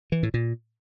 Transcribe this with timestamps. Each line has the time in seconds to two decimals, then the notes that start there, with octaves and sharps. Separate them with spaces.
0.12 E3
0.23 A2
0.34 A#2